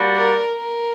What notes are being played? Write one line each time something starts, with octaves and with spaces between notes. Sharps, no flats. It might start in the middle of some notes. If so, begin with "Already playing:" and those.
Already playing: G3 A#3 D4 F#4
A#4
A#4